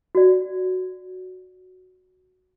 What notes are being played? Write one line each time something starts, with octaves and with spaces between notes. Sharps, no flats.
F#4 D5